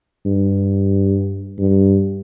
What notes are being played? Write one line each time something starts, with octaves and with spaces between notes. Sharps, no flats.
G2
G2